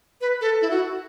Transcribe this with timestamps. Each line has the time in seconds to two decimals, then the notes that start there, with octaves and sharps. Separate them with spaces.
0.21 B4
0.41 A4
0.61 E4
0.70 F#4